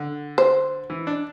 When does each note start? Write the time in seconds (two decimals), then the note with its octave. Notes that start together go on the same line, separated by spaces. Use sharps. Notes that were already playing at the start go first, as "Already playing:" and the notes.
Already playing: D3
0.38 C5
0.90 E3
1.07 D4